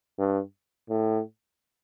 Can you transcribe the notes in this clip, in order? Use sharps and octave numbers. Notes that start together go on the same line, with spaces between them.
G2
A2